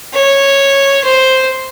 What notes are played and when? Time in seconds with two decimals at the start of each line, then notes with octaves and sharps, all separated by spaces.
0.14 C#5
1.04 C5